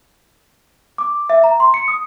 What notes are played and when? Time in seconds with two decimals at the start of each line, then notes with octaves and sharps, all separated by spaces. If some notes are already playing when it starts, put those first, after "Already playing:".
0.98 D6
1.30 E5
1.44 A#5
1.60 C6
1.74 C#7
1.88 D#6